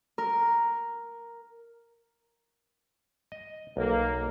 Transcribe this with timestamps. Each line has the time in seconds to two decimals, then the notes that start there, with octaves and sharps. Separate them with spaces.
0.18 A#4
3.32 D#5
3.77 B1 A#3